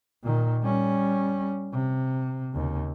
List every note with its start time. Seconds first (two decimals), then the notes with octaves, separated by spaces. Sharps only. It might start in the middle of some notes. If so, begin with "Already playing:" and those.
0.23 A#2 D#3
0.62 G3 C#4
1.73 C3
2.53 D#2 C#3